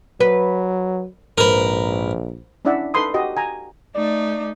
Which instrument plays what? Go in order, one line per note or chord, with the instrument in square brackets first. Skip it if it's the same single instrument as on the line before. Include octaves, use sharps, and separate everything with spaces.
[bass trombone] F#3 [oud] B4
[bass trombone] A#1 [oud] G#2 [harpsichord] A#4 B4
[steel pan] C#4 D4 E4 D5 E5 F#5
D#4 A4 B4 B5 C6 D#6
F#4 G4 D#5
G#5 A#5
[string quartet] A3 D#4 [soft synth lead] D5